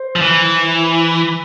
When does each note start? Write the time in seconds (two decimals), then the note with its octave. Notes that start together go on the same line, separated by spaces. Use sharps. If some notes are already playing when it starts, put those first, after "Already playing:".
Already playing: C5
0.16 F3
0.21 E3